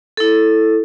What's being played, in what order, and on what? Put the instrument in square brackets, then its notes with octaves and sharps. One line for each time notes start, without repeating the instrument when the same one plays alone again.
[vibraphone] E4 A4